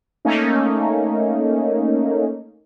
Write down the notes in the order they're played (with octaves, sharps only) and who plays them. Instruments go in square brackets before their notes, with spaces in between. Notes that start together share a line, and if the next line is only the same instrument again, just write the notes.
[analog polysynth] A3 A#3 C#4 D#4